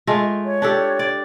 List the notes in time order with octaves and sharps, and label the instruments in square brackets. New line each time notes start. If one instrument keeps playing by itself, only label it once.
[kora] G#3 A3 F4
[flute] C#5
[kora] D4 G4 A4
D5